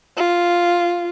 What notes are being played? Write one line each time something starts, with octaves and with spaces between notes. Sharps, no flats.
F4